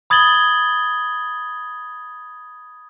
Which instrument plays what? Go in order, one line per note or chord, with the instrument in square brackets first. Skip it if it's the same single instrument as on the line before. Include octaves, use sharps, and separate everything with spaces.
[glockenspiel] B5 D#6 G#6 A6 F#7 G7